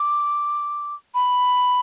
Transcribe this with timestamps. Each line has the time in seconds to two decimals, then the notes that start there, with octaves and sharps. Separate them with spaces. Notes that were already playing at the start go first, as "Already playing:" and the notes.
Already playing: D6
1.14 B5